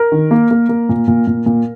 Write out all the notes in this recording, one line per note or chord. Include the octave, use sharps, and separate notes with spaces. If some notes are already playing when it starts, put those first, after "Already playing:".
Already playing: A#4
D#3
A#3
A#3
A#3
A#2
A#2
A#2
A#2